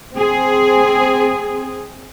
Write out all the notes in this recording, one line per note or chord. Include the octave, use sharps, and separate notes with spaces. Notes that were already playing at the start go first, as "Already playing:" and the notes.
C4 G#4